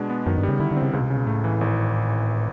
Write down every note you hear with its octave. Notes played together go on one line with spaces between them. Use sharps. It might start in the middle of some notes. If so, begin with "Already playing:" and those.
Already playing: B2 G#3 D4
B3
F#2 D#3
G2
G3
C#3
D3 E4
D3
C4
C#3
C#2 C#3
B2
C3
C#3
B2
A2 A3
E3
G#1